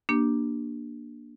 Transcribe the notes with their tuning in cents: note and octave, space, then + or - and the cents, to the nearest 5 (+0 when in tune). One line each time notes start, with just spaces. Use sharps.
A#3 +15 D4 +5 G4 -10